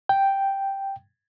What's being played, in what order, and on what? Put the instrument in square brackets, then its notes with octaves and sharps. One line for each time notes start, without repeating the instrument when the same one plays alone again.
[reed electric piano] G5